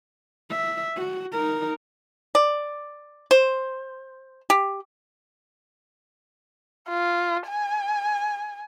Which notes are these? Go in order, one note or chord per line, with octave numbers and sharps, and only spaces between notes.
E5
F#4
D#4 A#4
D5
C5
G4
F4
G#5